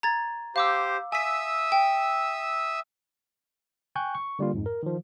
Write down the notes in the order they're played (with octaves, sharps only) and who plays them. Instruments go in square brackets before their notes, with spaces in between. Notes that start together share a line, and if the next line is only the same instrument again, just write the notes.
[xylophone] A#5 G#6 A6
[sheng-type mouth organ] G4 C5 [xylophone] F5 D6 E6
[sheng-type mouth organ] E5 D#6 E6 [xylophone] G#5 B6
[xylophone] G5
[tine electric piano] G5 G#5 C#6 F#6 G6
C#6
D3 G3 A#3 F4
F2 G#2
A#4
D#3 F3